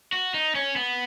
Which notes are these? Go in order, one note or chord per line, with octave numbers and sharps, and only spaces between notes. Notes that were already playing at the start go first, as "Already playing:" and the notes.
F#4
D#4
C#4
B3